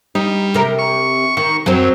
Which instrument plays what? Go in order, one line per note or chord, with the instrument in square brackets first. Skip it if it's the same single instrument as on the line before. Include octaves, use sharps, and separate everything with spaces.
[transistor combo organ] G3 [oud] D#4
[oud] C3 A#4
[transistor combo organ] C#6
[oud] D#3 [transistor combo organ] C#6
[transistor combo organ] F#2 [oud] F#3 C4